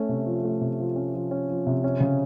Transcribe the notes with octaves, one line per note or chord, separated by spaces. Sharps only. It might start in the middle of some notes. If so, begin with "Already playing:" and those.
Already playing: A3 C#4
C3
F3
A3
C3
F3
C#4
F3
C#4
F3
C3
C#4
C#3